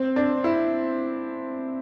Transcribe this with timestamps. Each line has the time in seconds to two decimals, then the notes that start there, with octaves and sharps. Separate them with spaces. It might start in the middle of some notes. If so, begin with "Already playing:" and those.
Already playing: C4
0.16 D4
0.44 E4